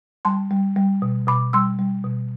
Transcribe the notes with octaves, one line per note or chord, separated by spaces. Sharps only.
G3 A5 C6
G3
G3
B2
B2 B5 D6
G3 C6 E6
G3
B2